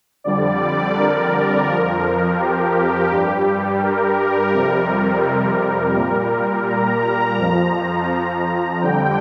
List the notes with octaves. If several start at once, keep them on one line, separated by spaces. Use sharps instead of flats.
F2 D3 G3 D5
A#4
F2 F3
G4
G2 G3
A#4
F2 C3 G3
A#2 G3
A#5
F2 F3
F2 D3 G3 G5